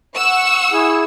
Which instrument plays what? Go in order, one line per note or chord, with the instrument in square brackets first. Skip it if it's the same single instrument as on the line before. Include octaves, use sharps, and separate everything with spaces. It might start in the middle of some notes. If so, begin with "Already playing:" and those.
[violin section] F#5 C#6 E6
[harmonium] E4 G#4